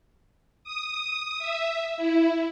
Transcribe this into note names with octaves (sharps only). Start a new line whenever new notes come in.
D#6
E5
E4